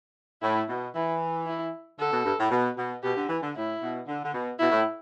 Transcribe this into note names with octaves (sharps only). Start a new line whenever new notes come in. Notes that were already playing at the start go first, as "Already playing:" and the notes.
A2 E4
B2
E3 E4
E4
D3 A4
B2
G2
A2
B2
B2
B2 G4
D3
E3
D3
A2 E4
B2
D3
D3
B2
B2 E4
A2